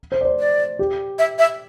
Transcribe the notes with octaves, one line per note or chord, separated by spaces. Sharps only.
C5
D5
C5
D5
G4
E5
E5